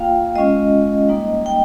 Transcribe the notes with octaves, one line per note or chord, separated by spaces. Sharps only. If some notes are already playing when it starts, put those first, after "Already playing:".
Already playing: A#3 F4 F5 G5
G#3 C#4 F4 D#5
G3 A#3 D#4
G5